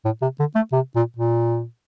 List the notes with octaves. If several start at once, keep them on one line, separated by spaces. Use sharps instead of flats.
A2
C3
D3
A3
C3
A#2
A#2